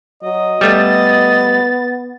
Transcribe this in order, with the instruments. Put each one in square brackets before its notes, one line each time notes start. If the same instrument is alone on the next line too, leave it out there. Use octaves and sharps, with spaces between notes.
[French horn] F#3 [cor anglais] D#5
[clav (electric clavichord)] G3 A3 [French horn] B3 [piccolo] A6